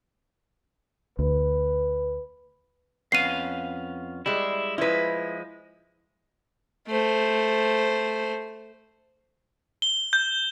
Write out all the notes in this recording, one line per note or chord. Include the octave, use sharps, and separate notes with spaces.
D2 B4
F2 B3 C#4 F5 C7 D#7
G3 G#3 E4
F3 G#3 E4 B4
A3 C5
G7
G6